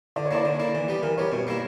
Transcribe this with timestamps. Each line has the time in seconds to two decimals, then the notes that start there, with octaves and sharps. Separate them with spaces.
0.16 D3 D5
0.26 C#5
0.31 A#3 E4 D5
0.45 D3
0.60 A#3 E4
0.75 E3
0.88 G3 B3
1.03 E3 A#4
1.17 G3 B3 C#5
1.32 B2 C#5
1.47 G3 A#3 E4